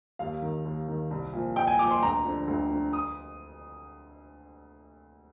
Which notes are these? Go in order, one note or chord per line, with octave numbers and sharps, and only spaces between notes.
D#2 F5
D#3
D#2
D#3
C2
A#2 F3
C2 G5
G#5
A#2 F3 D6
C6
D2 A#5
D3 F3
D2
D3 F3
D#6